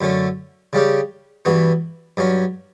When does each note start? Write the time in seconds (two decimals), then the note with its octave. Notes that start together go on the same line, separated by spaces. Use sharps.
0.01 F#2 D3 A3 C#4
0.73 C#3 G3 C#4 G4
1.45 G2 E3 B3 F#4
2.17 G2 F#3 C#4